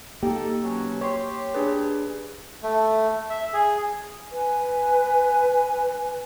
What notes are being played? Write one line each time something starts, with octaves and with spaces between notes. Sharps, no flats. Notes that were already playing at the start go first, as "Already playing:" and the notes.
A#3 D#4 G4 A4
B2 F#3 C#4
G4 C#5 C6
D4 G#4 B4
A3
E5
G#4
B4 G#5